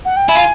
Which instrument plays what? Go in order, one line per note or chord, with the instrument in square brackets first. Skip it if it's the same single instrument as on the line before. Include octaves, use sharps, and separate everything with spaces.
[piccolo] F#5
G5
[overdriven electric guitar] E4 [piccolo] G#5
[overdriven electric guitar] F4